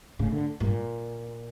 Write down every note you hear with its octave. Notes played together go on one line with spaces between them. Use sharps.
A2 C#3
D3
G2 A#2